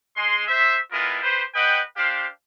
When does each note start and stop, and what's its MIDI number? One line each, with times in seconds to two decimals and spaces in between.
0.17 0.43 56
0.17 0.43 84
0.48 0.78 72
0.48 0.78 76
0.92 1.21 56
0.92 1.21 59
0.92 1.21 64
0.92 1.21 65
0.92 1.21 70
1.23 1.43 67
1.23 1.43 71
1.23 1.43 72
1.54 1.80 71
1.54 1.80 75
1.54 1.80 78
1.54 1.80 79
1.96 2.26 62
1.96 2.26 67
1.96 2.26 72
1.96 2.26 77